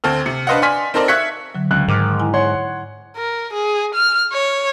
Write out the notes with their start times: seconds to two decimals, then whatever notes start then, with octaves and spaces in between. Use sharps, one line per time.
0.04 D2 C4 A4 F6
0.26 C3 C#7
0.47 D4 B4 C5 D#5 F5 F#5
0.62 D5 G#5 C6 F6 B6
0.94 C4 D#4 A4 A#4 C5 D5
1.08 E5 C#6 F#6 G#6 B6 C#7
1.55 D3 F#3
1.71 C#2 F#6
1.88 G#2 D#3 D6 F6
2.20 E4 G#5
2.34 C#5 F#5 C6
3.17 A#4
3.53 G#4
3.95 F6
4.33 C#5